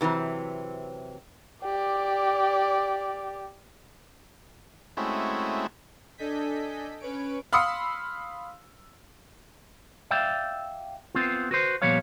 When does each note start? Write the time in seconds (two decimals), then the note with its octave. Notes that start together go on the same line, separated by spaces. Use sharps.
0.01 C3 E3 F#3 C4
1.63 G4 D5
4.97 G#3 A3 C4 C#4 E4 F#4
6.18 D4 A4 D#5 G#5 G6 B6
7.00 C#4 B4 C#5 D7
7.53 F5 B5 C6 D#6 E6 C#7
10.11 D5 E5 F5 G5
11.15 B3 C4 F4
11.51 F#4 B4 C5
11.82 A#2 F3 G3 B3 C#5 F5